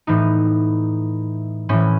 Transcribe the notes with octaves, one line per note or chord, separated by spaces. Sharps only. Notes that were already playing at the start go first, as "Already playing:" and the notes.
A2 E3 D#4
A2 E3 C#4